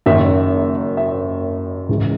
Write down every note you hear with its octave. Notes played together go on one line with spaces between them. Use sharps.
F#1 F#2 D#3 E5
E5
C#2 C#3 E3 G#3